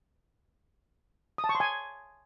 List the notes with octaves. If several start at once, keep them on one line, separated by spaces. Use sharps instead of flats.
D#6
A5
C#6
C6
G#5